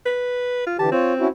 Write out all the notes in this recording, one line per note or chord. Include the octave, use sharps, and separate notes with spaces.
B4
F4
D3 E3 G4 A5
C4 F4 C#5
C#4 E4 F#4